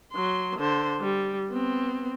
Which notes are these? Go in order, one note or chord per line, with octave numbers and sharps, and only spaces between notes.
F#3 C6
D3 C5
G3
B3 C4